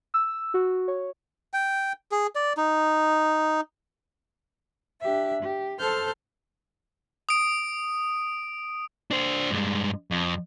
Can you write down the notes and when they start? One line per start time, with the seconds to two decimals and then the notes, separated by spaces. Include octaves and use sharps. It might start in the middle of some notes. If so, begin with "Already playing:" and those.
0.14 E6
0.54 F#4
0.88 C#5
1.54 G5
2.12 G#4
2.35 D5
2.57 D#4
5.01 D4 G4 E5
5.42 G4
5.79 A4 C5 A5 F6 G6
7.29 D#6 D7
9.11 D4 C5
9.51 G2 G#3
10.11 F2